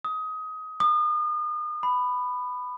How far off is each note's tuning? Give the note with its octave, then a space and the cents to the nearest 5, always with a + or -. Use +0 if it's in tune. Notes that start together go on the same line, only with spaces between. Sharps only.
D#6 +20
D#6 -40
B5 +10